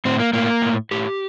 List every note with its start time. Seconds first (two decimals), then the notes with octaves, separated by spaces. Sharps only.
0.05 A2 C4
0.20 A#3
0.33 A2 A#3
0.62 A2
0.91 A2 G4